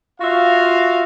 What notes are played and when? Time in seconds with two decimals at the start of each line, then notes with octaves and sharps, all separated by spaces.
0.20 F4 F#4 E5 F5